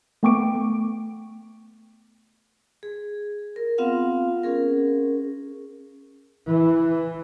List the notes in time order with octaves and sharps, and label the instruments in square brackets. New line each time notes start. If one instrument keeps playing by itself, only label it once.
[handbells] A3 B3 G5 C#6 D6 D7
[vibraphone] G#4
A#4
B3 C4 F4 F5 F#5
C#4 G#4 A#4
[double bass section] E3